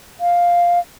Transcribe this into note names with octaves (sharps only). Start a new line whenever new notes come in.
F5